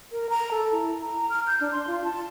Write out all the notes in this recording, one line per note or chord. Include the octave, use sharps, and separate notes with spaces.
A#4
A#5
A4
E4
A#5
F6
G6
D4
C6
F4
A5